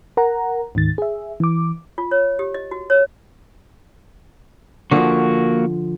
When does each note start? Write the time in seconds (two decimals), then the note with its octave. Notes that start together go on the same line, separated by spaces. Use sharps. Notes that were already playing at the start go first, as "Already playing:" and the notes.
0.17 A#4 F#5 A#5
0.75 D2 G#2 D#3 A6
0.98 G#4 E5
1.40 E3 D6
1.98 F4
2.11 C#5
2.39 G4
2.54 D#5
2.71 F#4
2.90 C#5
4.91 D3 F3 A#3 F#4